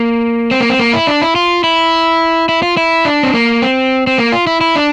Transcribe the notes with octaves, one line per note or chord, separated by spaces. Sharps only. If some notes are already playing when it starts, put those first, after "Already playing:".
Already playing: A#3
C4
A#3
C4
A#3
E4
D4
E4
F4
E4
E4
F4
E4
D4
C4
A#3
C4
C4
A#3
F4
E4
E4
D4